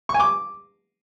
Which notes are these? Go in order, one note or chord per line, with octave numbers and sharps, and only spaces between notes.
C#6
G#5
D6